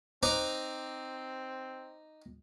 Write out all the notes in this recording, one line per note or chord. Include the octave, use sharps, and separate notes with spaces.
C4 D#4 C5 A#5 D6